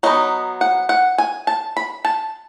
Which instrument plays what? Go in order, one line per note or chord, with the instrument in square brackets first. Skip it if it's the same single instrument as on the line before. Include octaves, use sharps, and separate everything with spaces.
[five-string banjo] F#3 B3 D#4 D#5
F#5
F#5
G#5
A5
B5
A5